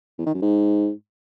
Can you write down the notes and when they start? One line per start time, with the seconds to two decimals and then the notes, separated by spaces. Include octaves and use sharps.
0.19 E2
0.26 D#3
0.34 F#2
0.42 G#2